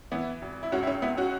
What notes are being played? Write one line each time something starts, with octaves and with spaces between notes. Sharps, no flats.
E3 B3 E4
G#1
E4
C#2 C#4 F#4
E4
C#4
C#2 B3 E4
C#4 F#4